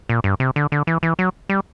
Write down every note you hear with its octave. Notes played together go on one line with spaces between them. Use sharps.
A#2
G2
C3
D3
D3
E3
E3
F#3
G3